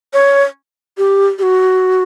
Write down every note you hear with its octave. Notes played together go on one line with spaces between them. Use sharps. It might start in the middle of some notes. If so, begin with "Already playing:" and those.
C#5
G4
G4
F#4